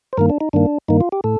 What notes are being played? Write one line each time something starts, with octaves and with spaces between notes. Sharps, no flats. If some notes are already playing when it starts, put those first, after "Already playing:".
C5
G2 D#3 A#3 A#4
D4
D#4
G2 D#3 A#3 D4
G2 D#3 A#3 D#4
F4
G4
A2 A4